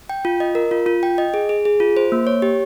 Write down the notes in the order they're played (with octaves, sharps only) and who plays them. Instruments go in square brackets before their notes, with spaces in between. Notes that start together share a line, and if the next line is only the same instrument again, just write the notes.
[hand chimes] G5
F4
D#5
A#4
F4
F4
G5
D#5
G#4
G#4
G#4
F4
C5
A#3
C#5
G4